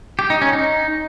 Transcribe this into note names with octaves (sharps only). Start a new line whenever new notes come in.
G4
D#4
C#4
D#4